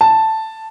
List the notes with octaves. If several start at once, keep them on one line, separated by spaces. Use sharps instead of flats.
A5